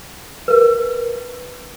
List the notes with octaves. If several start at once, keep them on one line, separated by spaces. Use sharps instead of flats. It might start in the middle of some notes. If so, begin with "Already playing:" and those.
A#4 B4